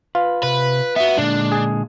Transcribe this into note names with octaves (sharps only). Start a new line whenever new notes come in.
F4 B4
C3 B4
B3 F#4 E5
A#2 D3 G#3 D4
G#4